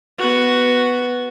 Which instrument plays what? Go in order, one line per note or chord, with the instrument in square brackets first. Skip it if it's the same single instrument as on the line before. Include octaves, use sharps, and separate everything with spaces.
[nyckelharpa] B3 F#4